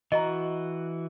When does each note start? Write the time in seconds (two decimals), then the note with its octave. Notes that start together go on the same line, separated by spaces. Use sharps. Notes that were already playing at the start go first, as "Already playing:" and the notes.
0.12 E3 F#4 D#5 A#5